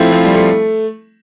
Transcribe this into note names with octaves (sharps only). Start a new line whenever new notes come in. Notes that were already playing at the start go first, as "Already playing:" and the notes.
Already playing: F3 A3 C4 E4
F3
G3
A3